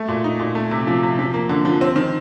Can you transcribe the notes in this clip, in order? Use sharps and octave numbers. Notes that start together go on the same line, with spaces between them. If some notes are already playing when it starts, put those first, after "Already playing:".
Already playing: A3
A#2
D#4
A#2
A3
C3
F3
C3
F3
A#3
D3
F3
C4
D#3